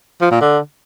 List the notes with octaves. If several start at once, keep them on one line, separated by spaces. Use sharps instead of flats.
F3
A#2
D3